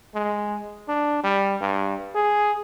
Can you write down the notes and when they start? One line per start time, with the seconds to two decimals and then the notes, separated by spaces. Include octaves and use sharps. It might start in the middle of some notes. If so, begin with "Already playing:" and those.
0.15 G#3
0.88 D4
1.23 G3
1.61 G2
2.15 G#4